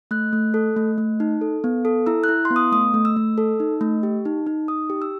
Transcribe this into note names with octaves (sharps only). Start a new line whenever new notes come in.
A3 F#6
A3
A4
A3
A3
D#4
A4
B3
A4
E4 E6
F#6
E4
C6
B3
D#6
A3 D#6
A3
E6
A3
A4
D#4
A3
G4
D#4
D#4
D#4 D#6
G4
E6